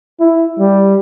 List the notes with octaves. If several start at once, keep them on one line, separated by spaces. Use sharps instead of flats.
E4
G3